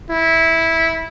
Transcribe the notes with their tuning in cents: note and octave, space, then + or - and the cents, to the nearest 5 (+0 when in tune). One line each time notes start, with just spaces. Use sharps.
E4 -15